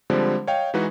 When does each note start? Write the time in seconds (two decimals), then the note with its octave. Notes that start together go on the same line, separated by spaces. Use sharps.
0.10 D3 F3 G3 G#3 C4
0.47 C#5 D#5 F5 G5
0.74 E3 G#3 D#4 F#4 B4